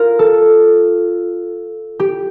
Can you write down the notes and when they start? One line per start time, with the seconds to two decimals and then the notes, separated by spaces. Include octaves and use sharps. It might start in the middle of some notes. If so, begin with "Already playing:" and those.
Already playing: F4 A#4
0.19 A4
2.00 G4